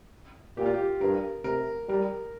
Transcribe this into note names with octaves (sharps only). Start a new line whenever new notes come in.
A#2 G4
F4
G4
G2 A#4
C3 A#4
G3 A#4